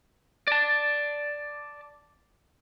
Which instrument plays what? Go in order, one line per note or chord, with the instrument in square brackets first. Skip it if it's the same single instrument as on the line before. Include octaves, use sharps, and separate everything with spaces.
[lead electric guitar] D5 A5